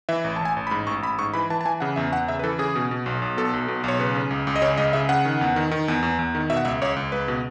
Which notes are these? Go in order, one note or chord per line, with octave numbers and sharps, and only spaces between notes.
E3 E5
A1
A5
A1 G#5
A1
B5
G#2
A1 C#6
A1 B5
G#2 C#6
E3 B5
E3 A5
A5
E3 G#5
C#3 F#5
E2 E5
E2 F#5
C#3 E5
B4
E3 A4
C#3 G#4
B2
B2
B1
B1
B2 A4
B1
B2
B1 C#5
C#3 B4
C#3
C#2
C#2
D#5
C#3 C#5
C#2 D#5
C#3 E5
C#3 F#5
D#3
E2
D#3
D#3
E2
E2
E2
D#3
B2 E5
F#5
C#2 E5
C#2 C#5
C#2
C#2 B4
B2